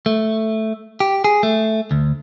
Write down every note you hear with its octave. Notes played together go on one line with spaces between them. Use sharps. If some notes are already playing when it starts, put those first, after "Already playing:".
A3
G4
G#4
A3
D2